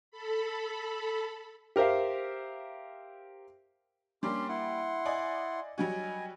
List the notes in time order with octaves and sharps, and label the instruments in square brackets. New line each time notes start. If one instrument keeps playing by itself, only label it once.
[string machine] A4 B5
[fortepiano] G4 A#4 C5 E5 F5
[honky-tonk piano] G3 A#3 D4 [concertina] C#4 G4 C6
[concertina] E4 F#5 C6
[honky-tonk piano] D5 D#5 G#5
[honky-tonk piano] F#3 G3 F#4 [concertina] D#5 G#5